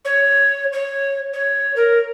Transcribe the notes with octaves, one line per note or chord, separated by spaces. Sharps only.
C#5
C#5
C#5
A#4